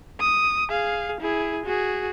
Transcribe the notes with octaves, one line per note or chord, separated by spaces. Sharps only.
D#6
G#4 F5
E4 G#4
F#4 G#4